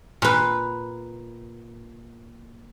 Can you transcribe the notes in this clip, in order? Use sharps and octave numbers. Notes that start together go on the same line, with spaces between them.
A#2 B4